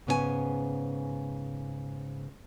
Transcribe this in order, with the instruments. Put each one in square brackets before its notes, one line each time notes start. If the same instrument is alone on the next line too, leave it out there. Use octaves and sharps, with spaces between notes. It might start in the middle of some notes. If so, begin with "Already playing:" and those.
[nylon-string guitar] G#2 C#3 B3 C#4 A4 G#5